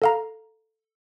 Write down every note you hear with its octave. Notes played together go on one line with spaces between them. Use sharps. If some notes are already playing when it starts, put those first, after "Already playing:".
A4 F5 A#5